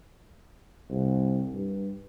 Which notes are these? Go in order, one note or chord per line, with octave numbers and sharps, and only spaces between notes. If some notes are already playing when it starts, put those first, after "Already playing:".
C2
G2